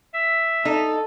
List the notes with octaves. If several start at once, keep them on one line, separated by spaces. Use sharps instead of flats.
E5
D#4 A4